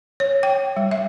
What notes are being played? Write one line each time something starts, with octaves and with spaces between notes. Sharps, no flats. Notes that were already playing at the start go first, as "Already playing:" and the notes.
C#5
G5
G3
E5